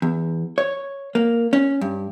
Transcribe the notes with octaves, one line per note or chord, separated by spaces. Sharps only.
E2
C#5
A#3
C#4
G2